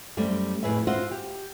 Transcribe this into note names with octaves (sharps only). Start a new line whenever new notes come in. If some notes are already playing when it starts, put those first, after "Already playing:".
F#2 G3 A3 C4
F2 A2 G#4 B4 E5
F4 F#4 C5 E5 F#5
G4